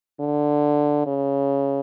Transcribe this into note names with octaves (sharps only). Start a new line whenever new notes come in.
D3
C#3